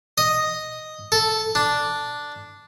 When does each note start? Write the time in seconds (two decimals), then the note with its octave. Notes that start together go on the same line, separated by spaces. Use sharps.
0.18 D#5
1.12 A4
1.55 D4